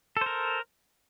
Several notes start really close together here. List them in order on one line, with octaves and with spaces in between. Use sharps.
A4 C5 A#4